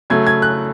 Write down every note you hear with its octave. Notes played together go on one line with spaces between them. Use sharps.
C#3 F#3 A3 G#6
G#6
F#6